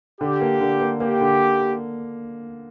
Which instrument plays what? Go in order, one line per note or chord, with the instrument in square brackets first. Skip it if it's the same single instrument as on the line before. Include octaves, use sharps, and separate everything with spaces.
[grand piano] D3 [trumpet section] G4
[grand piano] A#3
D3
A#3
[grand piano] A#3 [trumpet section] G4
[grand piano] D3